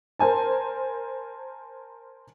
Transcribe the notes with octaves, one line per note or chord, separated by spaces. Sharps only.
A#4 C5 G#5 A5